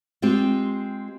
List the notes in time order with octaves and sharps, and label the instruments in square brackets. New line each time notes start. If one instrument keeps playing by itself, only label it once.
[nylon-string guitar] G#3 C4 F4 G4 C5